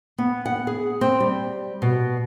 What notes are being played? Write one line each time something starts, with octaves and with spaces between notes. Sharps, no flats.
B3
F#5
G#4
C4
G3
B2